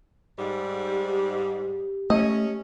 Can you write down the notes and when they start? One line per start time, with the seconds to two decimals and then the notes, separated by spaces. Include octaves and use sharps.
0.38 G#2 G3
0.87 G4
2.10 A3 C#4 D#5